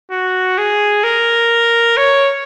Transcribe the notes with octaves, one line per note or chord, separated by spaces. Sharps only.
F#4
G#4
A#4
C#5